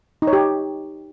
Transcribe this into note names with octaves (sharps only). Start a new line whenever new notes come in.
D#4
C#5
G4